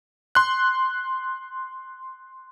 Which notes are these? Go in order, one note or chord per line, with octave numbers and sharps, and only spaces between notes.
C6 F#6